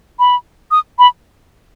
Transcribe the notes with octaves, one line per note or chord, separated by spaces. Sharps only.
B5
D#6
B5